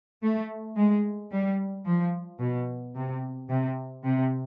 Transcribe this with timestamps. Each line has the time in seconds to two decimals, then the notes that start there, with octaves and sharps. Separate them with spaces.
0.22 A3
0.76 G#3
1.32 G3
1.86 F3
2.40 B2
2.95 C3
3.49 C3
4.04 C3